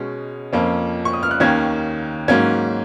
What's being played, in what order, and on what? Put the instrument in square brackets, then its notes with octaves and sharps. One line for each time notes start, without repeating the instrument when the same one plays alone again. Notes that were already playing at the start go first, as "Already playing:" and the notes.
Already playing: [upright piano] B2 G#3 C#4
F2 F3 A#3 C#4
C#6
D#6
F6
F#6
D#2 D#3 A#3 C#4 G#6
G#2 F#3 A#3 C#4 G#6